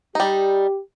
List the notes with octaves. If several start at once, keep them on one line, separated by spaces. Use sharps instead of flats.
G3 D#4 G4